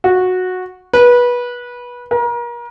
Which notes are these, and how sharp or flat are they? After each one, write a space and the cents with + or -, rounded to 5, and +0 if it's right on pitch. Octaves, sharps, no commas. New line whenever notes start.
F#4 -10
B4 -20
A#4 +35